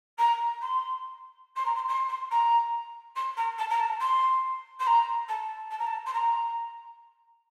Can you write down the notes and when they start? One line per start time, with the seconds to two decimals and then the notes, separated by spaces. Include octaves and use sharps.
0.18 A#5
0.61 C6
1.56 C6
1.65 A#5
1.75 C6
1.88 C6
2.09 C6
2.31 A#5
3.16 C6
3.37 A#5
3.58 A5
3.69 A#5
3.79 A5
4.00 C6
4.79 C6
4.86 A#5
5.28 A5
5.70 A5
5.79 A#5
5.86 A5
6.06 C6
6.13 A#5